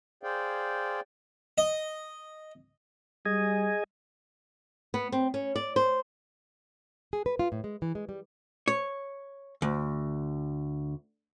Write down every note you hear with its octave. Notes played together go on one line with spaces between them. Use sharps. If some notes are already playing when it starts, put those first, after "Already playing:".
G#4 C5 D5 F5 G5
D#5
G3 G#4 D#5 G#5
B3
C4
C#4
D5
C5
G#4
B4
F4
A2
G#3
E3
G#3
G3
C#5
D2